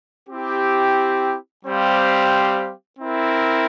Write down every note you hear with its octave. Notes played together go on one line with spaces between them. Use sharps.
C4 E4 G4
G3 C4 G4 C5 F5
C4 E4 A#4